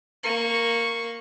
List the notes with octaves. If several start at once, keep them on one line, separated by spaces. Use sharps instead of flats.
A#3 C#6